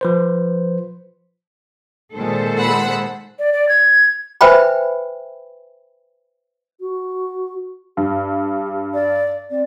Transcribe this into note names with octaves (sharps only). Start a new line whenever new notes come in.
F3 B4 C5
A#2 D#3 G#3 A4 C5
F#5 B5 E6
D5
D5
G#6
B4 C5 E5 G5 G#5 B5
F#4
G2 G4
D5
C4 D5